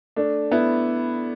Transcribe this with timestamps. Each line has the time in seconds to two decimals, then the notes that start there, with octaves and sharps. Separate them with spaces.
0.16 A3 D4
0.51 B3 E4